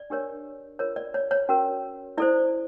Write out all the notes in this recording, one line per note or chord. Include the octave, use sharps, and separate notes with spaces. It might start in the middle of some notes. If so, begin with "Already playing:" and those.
Already playing: D5
D4 G4 A#4 C#5
F4 A#4 C#5
D5
C#5
C#5
C#4 F#4 A#4
E4 A4 C5 D5